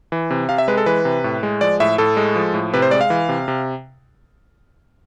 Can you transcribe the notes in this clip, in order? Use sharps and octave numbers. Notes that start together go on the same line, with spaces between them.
E3
C3
C3 F5
E5
G#3 B4
A4
E3 B4
C3
A2
G#3
F3 D5
A2 E5
A2 A4
G#3
F3
A2
C3 B4
C5
G#3 D5
F5
E3
C3
C3